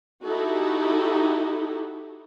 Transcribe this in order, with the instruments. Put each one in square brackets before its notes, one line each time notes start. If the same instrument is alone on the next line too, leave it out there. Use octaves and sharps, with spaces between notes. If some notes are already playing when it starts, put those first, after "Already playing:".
[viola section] D#4 E4 F#4 G4 A4